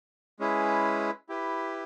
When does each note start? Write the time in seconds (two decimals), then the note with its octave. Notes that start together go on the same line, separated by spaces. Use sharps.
0.39 G#3 C#4 E4 G#4 B4
1.29 E4 G4 B4